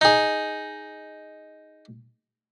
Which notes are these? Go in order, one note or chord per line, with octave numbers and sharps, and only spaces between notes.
D#4 G#4